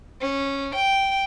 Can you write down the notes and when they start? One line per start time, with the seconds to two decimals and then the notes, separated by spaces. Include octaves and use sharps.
0.21 C#4
0.75 G5